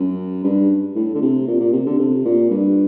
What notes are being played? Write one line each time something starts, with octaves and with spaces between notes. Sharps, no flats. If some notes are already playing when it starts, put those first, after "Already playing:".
Already playing: F#2
G2
A2
D3
C3
A#2
A#2
C3
D3
C3
A#2
G2